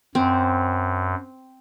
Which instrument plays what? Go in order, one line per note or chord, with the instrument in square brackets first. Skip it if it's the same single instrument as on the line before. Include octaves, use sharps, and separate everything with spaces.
[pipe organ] F#2 [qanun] C4